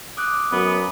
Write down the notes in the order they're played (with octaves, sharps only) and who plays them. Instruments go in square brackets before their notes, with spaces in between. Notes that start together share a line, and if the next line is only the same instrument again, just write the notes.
[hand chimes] D6 D#6 F#6
[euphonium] F#2 [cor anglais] B3